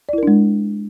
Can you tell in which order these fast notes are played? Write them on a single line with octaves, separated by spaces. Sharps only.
D5 E4 A#4 D4 G#3